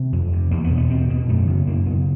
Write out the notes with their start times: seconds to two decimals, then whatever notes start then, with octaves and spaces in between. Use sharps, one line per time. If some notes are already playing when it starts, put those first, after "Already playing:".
Already playing: C3
0.13 F2
0.32 C3
0.51 E2 A#3
0.64 B3
0.70 B2
0.77 B3
0.90 E2 C4
1.10 B2
1.28 F#2 A3
1.47 C#3
1.67 F#2 A#3
1.86 C#3 B3